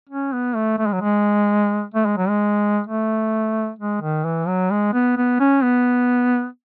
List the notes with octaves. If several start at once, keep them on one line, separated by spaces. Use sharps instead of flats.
C#4
B3
A3
A3
G#3
F#3
G#3
A3
G#3
F#3
G#3
A3
G#3
D#3
E3
F#3
G#3
B3
B3
C#4
B3